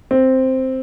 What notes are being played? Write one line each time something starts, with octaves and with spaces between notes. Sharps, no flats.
C4